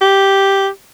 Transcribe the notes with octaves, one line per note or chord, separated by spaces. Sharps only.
G4